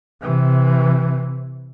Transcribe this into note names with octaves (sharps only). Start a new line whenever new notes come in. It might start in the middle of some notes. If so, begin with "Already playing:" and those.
C3 E3